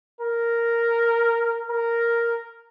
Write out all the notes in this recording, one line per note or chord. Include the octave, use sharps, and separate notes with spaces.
A#4
A#4